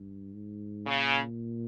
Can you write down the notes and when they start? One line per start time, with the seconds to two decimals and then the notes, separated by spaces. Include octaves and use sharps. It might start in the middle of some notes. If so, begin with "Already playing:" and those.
Already playing: G2
0.34 G#2
0.87 A#2 C#3